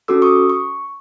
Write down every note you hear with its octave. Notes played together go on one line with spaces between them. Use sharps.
C#4 F#4 A4 D6 E6
C#6 D#6
C#6